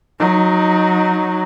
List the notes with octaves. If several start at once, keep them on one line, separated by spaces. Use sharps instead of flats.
F#3 D#4